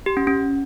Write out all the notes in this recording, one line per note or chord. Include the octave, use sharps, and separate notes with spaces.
G4
C#4
C#4